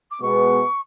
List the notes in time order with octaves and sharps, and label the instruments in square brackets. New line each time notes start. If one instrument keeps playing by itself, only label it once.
[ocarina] D6
[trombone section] B2 G#3 B3 [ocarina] C#6